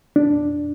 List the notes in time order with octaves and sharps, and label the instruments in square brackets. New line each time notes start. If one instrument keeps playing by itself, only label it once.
[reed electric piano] D4